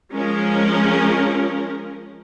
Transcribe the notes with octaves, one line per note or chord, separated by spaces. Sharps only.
F3 G#3 C#4 A#4